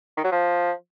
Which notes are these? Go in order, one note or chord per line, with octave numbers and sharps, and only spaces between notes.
D#3
F#3
F3